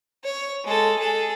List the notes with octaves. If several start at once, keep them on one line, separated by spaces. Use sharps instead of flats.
C#5
G#3 A4
G#4 A4